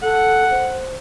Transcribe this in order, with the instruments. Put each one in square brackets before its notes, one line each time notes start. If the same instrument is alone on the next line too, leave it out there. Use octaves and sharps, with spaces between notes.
[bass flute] A4 [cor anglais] F#5
[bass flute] C5